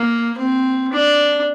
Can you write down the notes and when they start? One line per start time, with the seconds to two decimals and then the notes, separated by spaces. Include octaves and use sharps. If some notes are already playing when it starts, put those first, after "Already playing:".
Already playing: A#3
0.38 C4
0.92 D4